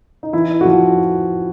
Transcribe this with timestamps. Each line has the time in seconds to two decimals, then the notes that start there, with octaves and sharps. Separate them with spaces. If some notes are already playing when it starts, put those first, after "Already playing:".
0.23 D#4
0.33 E3 E4
0.61 F#4
0.65 F3 F4